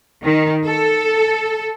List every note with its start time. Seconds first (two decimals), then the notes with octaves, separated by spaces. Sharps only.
0.23 D#3
0.65 A4